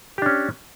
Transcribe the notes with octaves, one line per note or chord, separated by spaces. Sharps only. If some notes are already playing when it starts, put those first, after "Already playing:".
C#4 D4 G4